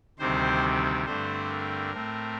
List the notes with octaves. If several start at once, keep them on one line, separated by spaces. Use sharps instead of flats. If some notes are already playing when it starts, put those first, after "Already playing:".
D2 C3 D#3 G3 C4 C5
G2 D3 A3 C4 C5
A#4
A2 A3 C4